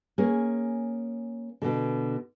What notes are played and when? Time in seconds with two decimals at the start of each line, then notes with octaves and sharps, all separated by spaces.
0.18 A#3 C#4 G#4
1.62 B2 D3